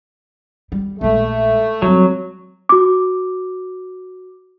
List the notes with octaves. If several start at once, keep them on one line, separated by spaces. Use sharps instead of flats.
G3
A#1 G#3 A3
F#3 G3 C4
F#4 D6